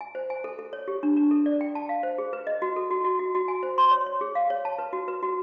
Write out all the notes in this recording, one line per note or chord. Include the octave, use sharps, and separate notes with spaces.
G#5
C5
G#5
A4
A4
C#5
G4
D4
D4
A4
D5
G5
A5
F5
C5
G#4
B4
D#5
F#4
A4
F#4
F#4
F#4
F#4
G#5
C5
C6
C#5
C#5
G#4
F5
C#5
A5
B4
F#4
B4
F#4